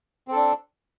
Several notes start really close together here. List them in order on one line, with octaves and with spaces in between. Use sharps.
C4 A4 D4